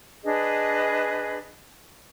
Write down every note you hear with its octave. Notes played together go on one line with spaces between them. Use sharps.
D4 G#4 B4 D#5